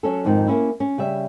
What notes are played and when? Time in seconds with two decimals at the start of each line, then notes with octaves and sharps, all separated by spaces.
0.03 F#3 C#4 A4
0.25 F2 G#2 D#3 C4
0.47 A#3 C#4 E4
0.80 C#4
0.98 C#3 G3 E5